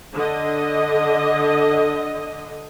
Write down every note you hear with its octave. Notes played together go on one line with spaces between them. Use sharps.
D3 D#5